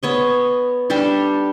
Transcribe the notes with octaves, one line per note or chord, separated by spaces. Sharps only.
B3 C#5 D#5
G3 D4 G4 A4